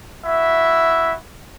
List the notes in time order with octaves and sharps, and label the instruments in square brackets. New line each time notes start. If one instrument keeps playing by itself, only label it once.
[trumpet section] E4 F#4 E5